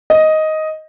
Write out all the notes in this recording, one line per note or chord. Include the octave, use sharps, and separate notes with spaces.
D#5